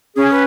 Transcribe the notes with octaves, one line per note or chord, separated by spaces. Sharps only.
C#4 G#4
B4